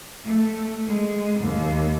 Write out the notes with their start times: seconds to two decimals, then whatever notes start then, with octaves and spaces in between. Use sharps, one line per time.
0.23 A3
0.86 G#3
1.41 D#2